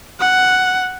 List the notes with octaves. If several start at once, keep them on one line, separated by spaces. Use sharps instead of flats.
F#5